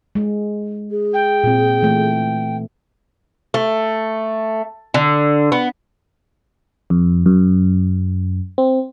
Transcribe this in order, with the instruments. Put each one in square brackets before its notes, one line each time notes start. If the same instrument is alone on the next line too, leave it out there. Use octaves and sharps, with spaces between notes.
[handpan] G#3
[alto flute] G#4
[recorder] G5
[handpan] A#2 C4
E3 A3
[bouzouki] A3
D3
B3
[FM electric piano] F2
F#2
C4